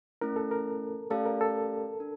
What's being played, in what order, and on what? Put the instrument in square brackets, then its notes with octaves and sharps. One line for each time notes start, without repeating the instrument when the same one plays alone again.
[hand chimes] A3 C#4 E4 [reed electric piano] A#4
[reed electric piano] A4
A#4
[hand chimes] A3 C#4 G4 D5 F5 [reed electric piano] A4
[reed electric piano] A#4
A4
[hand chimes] D4